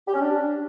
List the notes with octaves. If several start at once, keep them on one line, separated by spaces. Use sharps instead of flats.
G4
C#4
D4